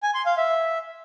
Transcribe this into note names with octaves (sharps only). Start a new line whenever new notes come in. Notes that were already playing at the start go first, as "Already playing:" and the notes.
G#5
C6
F5
E5